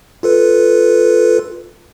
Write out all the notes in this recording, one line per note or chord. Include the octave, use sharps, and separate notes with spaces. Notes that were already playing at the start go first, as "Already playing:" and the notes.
F4 A4 B4